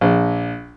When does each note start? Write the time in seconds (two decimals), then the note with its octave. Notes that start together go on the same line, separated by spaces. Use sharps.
0.01 A#1